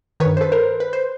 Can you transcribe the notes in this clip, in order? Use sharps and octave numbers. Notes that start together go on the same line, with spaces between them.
D#3 B4 C#5
G2
C5
A4 B4
A#4 C5
B4
C5